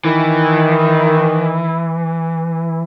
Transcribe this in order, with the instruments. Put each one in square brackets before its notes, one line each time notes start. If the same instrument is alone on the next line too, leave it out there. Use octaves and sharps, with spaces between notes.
[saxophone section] D#3 [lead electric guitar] E3